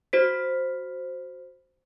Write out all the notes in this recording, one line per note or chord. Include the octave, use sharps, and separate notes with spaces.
F#4 C5 B6